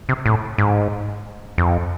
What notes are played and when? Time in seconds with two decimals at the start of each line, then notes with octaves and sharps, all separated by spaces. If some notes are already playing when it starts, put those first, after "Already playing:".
0.09 C3
0.26 A2
0.58 G#2
1.58 F2